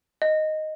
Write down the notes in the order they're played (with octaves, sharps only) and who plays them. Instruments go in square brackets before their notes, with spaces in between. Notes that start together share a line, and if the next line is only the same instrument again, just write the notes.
[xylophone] D#5